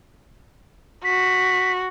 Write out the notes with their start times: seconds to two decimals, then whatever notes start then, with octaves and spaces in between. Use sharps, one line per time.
1.05 F#4 B6